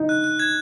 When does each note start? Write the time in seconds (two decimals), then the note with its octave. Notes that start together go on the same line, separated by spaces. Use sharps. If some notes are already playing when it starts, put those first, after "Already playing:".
Already playing: D#4
0.09 F#6
0.24 F#6
0.39 G#6